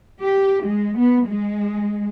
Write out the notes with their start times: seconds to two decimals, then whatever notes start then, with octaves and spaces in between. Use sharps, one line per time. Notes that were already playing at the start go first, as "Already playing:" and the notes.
0.22 G4
0.64 G#3
0.98 B3
1.29 G#3